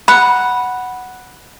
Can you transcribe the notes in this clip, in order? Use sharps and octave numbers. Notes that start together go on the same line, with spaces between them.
F#5 B5